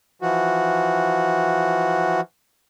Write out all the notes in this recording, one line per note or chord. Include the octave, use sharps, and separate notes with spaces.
E3 F3 F#4